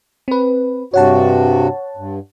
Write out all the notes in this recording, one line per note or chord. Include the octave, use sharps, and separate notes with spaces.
C4 B4
G2 C3 F#4 C#5 F#5 A5
G2